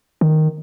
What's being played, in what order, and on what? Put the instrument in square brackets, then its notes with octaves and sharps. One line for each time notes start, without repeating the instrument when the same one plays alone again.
[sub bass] D#3